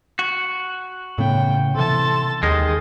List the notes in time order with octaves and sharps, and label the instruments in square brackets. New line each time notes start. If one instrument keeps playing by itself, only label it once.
[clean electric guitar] F#4
[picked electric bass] A2 C#3 B3 [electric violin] G5
[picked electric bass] C3 E3 [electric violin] A4 A5 [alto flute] C6
[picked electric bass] D#2 [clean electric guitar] D#3 G#3 [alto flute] G#4 [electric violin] D#5